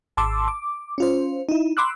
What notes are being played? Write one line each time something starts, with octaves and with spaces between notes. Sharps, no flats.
G#1 A5 C6 D6 E6
D6
C#4 F4 C5
D#4 E4
B5 C6 D6 E6 F#6